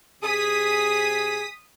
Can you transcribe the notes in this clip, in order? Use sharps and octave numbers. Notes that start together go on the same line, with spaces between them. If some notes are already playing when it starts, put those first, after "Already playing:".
C3 G#4 D#6 B6